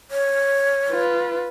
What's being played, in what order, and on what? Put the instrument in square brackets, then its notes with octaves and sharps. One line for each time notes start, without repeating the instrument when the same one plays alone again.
[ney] C#5
[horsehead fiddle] F4 B4